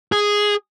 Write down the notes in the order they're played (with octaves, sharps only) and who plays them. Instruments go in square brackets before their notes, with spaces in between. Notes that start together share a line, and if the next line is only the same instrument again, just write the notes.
[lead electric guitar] G#4